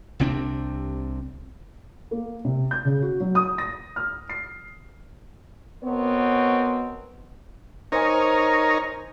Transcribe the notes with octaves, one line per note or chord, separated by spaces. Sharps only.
C2 C3 C4 D4
A#3
C3
G6
C#3
F#4
F#3
D#6
A#6
F6
C7
B2 B3 C4 A#4 C#5
D#4 A#4 C5 C#5 G#5